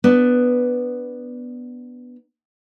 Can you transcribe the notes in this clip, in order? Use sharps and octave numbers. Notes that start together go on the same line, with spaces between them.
B3 D4